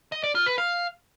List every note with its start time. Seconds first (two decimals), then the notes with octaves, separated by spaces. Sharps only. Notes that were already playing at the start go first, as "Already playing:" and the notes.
0.12 D#5
0.24 D5
0.35 F4
0.46 B4
0.58 F5